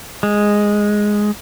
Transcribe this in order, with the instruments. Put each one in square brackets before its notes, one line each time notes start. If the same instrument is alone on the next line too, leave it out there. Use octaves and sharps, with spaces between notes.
[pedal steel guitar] G#3